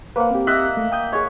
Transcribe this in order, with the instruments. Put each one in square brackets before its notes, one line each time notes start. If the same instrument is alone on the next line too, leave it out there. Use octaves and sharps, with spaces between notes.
[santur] A#3 [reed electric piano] B4 C5 F#5
[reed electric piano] C4 G4
[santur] D#5 E5 F#5
[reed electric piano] A3
G5 D#6 G6
[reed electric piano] G#4 D#5 [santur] C#5